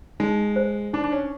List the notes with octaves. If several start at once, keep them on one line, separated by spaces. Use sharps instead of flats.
G#3 D#4
C5
D4 D#4
D4
C#4